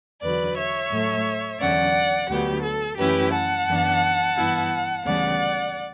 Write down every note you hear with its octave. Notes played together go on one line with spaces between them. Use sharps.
E2 D3 F#3 B4 D5
C#5 E5
A2 F#3 A3
E2 D3 F#3 C#4 D5 F#5
D2 D3 F#3 B3 G4
A4
F#2 E3 A3 C#4 E4 G4 B4
F#5 A5
F#2 E3 B3 D4
G2 E3 B3 E4
D2 C#3 E3 G3 B3 D5 F#5